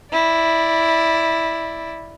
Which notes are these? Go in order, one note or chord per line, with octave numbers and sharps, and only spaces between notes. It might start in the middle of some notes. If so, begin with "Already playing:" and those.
E4 D5